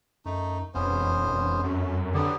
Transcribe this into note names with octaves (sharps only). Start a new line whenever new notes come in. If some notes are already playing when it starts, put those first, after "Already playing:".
F#2 A3 D#4
E1 F2 B3 C#4 C5
F2
F#2 A3
D3 F#3 B3 G4